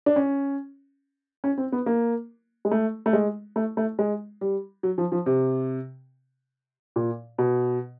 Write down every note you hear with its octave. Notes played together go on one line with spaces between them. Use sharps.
D4
C#4
C#4
C4
B3
A#3
G#3
A3
A3
G#3
A3
A3
G#3
G3
F#3
F3
F3
C3
A#2
B2